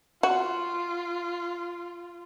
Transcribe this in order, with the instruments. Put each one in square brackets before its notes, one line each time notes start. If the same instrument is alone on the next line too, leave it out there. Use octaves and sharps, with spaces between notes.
[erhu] F4 [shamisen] F#4